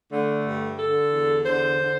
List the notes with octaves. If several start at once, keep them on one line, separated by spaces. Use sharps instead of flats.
D3 A3
G2
D3 A4
E2
D3 C5
D3